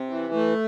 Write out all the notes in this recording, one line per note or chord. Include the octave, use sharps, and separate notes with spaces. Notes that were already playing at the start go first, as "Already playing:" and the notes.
Already playing: C3
E3
A3